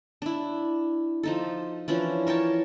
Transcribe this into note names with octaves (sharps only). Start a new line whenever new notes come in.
D4 E4
F3 D#4 A4
E3 F3 C#4 D4
A#4 C#5 G5 A5